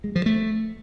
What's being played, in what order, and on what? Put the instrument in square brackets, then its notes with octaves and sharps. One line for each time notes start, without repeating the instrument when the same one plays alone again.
[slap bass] G#3
F3
A3